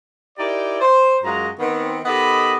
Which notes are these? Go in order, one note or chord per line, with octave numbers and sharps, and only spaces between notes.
D#4 E4 G4 A#4 D5
C5
F#2 G#3 F4 F#4 A#5
D#3 B3 C4
D#3 B3 G4 A4 D#5 B5